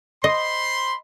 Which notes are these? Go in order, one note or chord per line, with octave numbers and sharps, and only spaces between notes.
C5 D#5 B5 C6